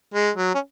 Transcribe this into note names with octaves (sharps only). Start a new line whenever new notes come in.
G#3
F#3
C#4